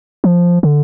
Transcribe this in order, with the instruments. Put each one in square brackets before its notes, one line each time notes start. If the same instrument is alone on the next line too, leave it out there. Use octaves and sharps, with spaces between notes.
[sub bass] F3
D3